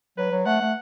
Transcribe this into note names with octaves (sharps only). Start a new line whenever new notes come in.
F#3 B4
F#3
A3 F#5
A3